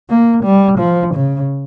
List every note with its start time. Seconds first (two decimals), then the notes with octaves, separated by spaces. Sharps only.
0.10 A#3
0.44 G3
0.79 F3
1.15 C#3